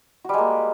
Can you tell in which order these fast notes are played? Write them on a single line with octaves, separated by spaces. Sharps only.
F#4 G3 G#3 A#3